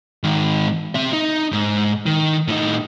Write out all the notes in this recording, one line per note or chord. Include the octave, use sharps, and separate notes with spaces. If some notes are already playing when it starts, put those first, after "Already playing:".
G#2 D#3
C4 E5
D#4
G#2
D#3
A2 D#4